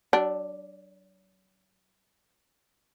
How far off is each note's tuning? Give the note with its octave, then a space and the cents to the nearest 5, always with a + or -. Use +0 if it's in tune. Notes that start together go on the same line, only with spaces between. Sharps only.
F#3 +35 D4 +0